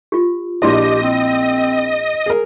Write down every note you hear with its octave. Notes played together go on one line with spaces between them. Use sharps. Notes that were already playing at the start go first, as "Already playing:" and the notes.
F4 G4
A#1 D4 E4 G4 D#5 C6
C4
G#4 A#4